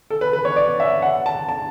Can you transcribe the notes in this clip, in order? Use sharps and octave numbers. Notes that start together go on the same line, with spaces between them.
A4
B4
B4
C#5
D5
E5
F#5
A5
A5